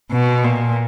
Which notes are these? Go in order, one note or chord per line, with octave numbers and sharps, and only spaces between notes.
B2
A#2